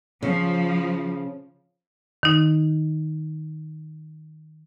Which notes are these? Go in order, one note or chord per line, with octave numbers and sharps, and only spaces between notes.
C#3 F3
D#3 D#4